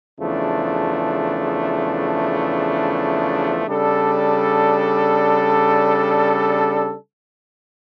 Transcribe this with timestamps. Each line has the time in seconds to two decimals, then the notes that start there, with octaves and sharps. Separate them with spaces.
0.19 E2 C#3 F3 A3 D4
3.66 C#3 G3 D4 A4